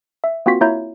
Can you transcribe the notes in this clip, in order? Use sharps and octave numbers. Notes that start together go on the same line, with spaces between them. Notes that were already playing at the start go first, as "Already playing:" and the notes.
E5
A#3 C4 F4 F#4 B6
A#3 E4 C#5 E5 A#5 G6